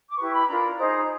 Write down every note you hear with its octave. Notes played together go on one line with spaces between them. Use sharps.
D6
E4 G4 B4 C#6
B5
D4 F4 A#4 A#5
D#4 G#4 C5